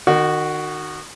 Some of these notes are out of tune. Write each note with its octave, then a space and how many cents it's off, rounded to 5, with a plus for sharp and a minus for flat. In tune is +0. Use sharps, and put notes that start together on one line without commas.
D#3 -30 F#4 +0